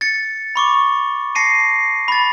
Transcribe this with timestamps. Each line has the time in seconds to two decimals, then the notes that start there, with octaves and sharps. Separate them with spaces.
0.01 A6 C#7
0.56 B5 C#6 D6
1.35 A5 A#6 C7 C#7 D#7
2.08 B5 A6